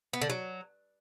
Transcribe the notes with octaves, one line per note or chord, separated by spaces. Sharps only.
B3
D3
F#3